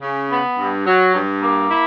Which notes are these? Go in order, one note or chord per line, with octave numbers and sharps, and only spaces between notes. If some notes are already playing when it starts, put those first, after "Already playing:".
C#3
B3
G2
F#3
G2
A#3
E4